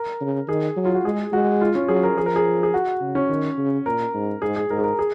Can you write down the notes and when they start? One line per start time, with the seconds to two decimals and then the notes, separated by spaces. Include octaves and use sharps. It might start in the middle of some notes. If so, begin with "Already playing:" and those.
Already playing: A#4
0.21 C#3
0.48 D#3 G#4
0.76 F#3
0.85 F4
0.94 F#4
1.04 G#3 G#4
1.32 G#3 F#4
1.61 F4
1.75 C#4
1.88 F#3 G#4
2.03 A#4
2.17 F3 G#4
2.26 A#4
2.36 G#4
2.63 G#4
2.74 F#4
3.01 C#3
3.15 C#4
3.29 D#3
3.58 C#3
3.86 A#2 A#4
4.14 G#2
4.42 G#2 G#4
4.56 G#4
4.70 G#2 A#4
4.78 G#4
4.84 A#4
4.99 G#4